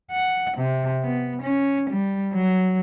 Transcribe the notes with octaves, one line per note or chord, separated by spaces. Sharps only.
F#5
C3
B3
C#4
G3
F#3